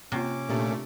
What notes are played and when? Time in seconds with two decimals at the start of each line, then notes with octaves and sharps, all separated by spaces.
0.12 C3 A#3 C4 C#4 F4 D6
0.49 A#2 A3 D4 G4 A4